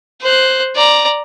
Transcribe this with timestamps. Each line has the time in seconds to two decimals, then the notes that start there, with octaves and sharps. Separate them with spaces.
0.21 C5 F#6
0.76 D5 A#5